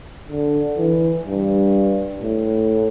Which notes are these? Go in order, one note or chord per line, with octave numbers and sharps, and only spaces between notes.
D3
E3
G2
A2